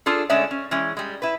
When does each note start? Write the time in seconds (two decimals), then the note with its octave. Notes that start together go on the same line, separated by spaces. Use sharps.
0.06 D4 F4 G#4 A4
0.30 D3 G#3 A3 C#4 D5 E5
0.51 C#4
0.71 E3 G#3 C#4
0.97 G3 G#3
1.22 E4 B4